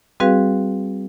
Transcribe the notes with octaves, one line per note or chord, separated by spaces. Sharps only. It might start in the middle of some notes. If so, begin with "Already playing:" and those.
G3 C4 F#4 G#4 B4 F5